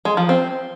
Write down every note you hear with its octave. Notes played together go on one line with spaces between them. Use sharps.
G#3
F3
C4